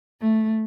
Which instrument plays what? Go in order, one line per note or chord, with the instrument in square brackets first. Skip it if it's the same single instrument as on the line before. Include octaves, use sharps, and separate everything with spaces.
[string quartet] A3